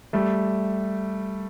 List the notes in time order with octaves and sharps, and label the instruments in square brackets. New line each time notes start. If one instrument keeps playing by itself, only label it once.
[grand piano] G3 A3